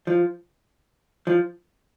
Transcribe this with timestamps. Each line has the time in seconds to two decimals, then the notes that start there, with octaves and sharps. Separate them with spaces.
0.07 F3
1.27 F3